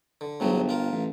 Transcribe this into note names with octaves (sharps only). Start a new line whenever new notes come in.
D3
G1 G#2 F#3 G#3
G1
F4 A#4
A1